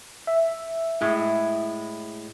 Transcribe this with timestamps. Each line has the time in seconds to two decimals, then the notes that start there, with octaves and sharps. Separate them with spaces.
0.27 E5
1.01 A2 G#3 E4